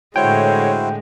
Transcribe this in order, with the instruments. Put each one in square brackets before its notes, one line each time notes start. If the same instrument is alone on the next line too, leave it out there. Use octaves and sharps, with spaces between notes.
[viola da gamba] A2 D3 G#3 [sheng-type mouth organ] E4 F#4 C5 [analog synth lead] C#5 [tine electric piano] G5